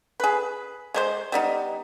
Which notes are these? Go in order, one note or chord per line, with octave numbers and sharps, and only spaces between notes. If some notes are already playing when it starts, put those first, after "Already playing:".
G#4 B4
G#3 A3 C5
G3 B3 D#4